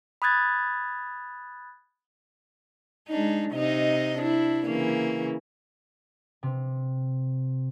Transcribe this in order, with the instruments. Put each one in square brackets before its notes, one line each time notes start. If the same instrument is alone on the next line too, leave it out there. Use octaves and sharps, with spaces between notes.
[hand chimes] B5 D#6 F#6 G#6 A6
[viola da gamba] G#3 D4 D#4
C3 D#4 D#5
D4 E4
C#3 E3 A#3
[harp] C3